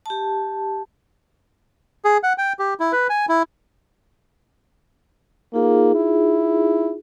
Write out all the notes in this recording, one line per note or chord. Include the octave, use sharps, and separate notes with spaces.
G4 A5
G#4
F#5
G5
G4
E4
B4
G#5
E4
A#3 D#4 F4 G#4
E4